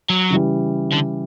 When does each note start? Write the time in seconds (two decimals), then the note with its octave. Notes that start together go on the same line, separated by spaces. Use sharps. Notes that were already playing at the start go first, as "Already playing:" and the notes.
0.10 F#3
0.30 C#3 E3 G3
0.93 D3